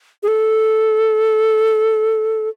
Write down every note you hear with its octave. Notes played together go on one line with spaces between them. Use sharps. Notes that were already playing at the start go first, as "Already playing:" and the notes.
G#4
A4